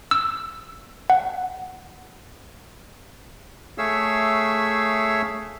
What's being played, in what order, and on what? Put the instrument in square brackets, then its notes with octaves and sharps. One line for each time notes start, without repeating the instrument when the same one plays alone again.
[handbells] E6
F#5
[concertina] A3 G#4 C#5 E5 F5 E6